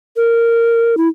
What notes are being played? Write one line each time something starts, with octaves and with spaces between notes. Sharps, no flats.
A#4
E4